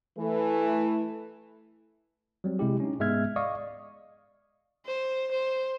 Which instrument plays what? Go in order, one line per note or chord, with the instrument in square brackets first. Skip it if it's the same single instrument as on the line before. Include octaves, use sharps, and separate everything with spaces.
[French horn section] E3 A3
[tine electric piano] F#3 G3 C4
C3 G#3 E4 G4
C#4 D#4
G#2 G#3 B3 E5 F6 G#6
D5 D#5 F5 C#6 D#6
[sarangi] C5
C5